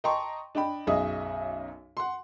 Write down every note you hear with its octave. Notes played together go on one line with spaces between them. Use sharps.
D#5 G5 A5 A#5 C6 C#6
D4 D#5 G5 B5
B1 F#2 G#4 D#5 E5 D#6
F#5 C6